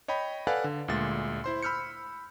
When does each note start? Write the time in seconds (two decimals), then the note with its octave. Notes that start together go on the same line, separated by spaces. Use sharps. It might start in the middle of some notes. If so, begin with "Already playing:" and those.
0.08 C#5 D#5 G5 B5
0.47 A4 B4 D5 F5 F#5 G#5
0.64 D3
0.88 D2 A#2 G#3 A6
1.44 E4 C5 C6
1.63 B5 E6 F6 G6 C#7